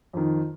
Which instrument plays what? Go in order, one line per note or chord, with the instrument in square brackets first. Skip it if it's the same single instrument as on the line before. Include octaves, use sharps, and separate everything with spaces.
[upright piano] F2 D#3